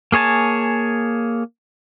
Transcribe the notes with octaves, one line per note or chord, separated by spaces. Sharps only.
A#3 G#4 C#5 G#5 A5